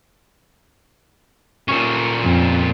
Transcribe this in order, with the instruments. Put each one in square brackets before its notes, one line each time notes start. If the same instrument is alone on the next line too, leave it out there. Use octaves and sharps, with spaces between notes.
[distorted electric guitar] A#2 C#4
[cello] F2